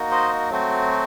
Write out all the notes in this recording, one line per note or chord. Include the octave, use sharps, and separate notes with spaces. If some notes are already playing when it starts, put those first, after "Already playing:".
Already playing: A#3 D#4 F#4
C5 D#5
F#3 A3 C4 F#4